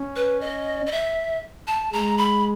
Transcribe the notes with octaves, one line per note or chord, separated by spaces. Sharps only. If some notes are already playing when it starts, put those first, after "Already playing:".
Already playing: C#4
B4
D#5
D#5
E5
A5
G#3 A#5
B5